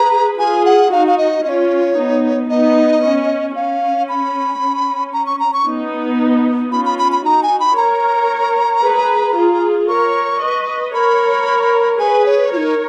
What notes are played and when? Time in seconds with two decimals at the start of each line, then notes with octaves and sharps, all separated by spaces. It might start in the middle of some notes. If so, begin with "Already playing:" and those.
Already playing: G#4 B4 A#5
0.38 F4 G#4 G#5
0.65 F#5
0.92 D#4 F#4 F5
1.07 F5
1.18 D#5
1.44 C#4 F4 C#5 D#5
1.97 B3 D#4
2.50 B3 D#4 D#5
3.03 C#4
3.56 C#4 F5
4.09 B5
4.61 C#4
5.13 A#5
5.26 C#6
5.40 A#5
5.53 C#6
5.67 B3 D#4
6.72 C#4 F4 B5
6.85 B5
6.99 B5
7.12 B5
7.25 D#4 F#4 A#5
7.43 G#5
7.60 B5
7.77 A#4 C#5 A#5
8.83 G#4 B4
9.36 F4 G#4
9.88 A#4 C#5 C#6
10.41 B4 D#5
10.94 A#4 C#5 B5
11.99 G#4 B4 G#5
12.26 C#5
12.52 F4 A#4 C#5
12.57 D#4